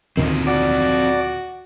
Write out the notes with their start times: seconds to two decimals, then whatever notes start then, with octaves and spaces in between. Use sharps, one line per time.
0.17 D2 A#2 D#3 C4 F4 D#5
0.47 F#4 D5